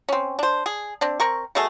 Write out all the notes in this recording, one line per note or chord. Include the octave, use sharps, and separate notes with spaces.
C4 C#4
D4 C5
G#4
C4 D4
C4 A#4 C#6
B2 A3 G#4 A4